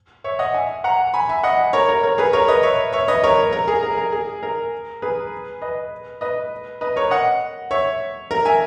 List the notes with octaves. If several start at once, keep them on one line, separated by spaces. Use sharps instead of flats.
C#5 E5
D#5 F#5
E5 G#5
F#5 A#5
G#5 B5
E5 G#5
D#5 F#5
A#4 C#5
A#4
A#4 C#5
G#4 B4
A#4 C#5
B4 D#5
C#5 E5
C#5 E5
B4 D#5
A#4 C#5
A#4
G#4
A#4
A#4
G#4
A#4
G#4 B4
B4 D#5
B4 D#5
B4 D#5
A#4 C#5
D#5 F#5
C#5 E5
A#4
E5 G#5